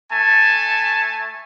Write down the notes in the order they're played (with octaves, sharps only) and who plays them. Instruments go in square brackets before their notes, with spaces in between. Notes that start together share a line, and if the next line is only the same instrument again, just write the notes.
[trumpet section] A3 G#5 A5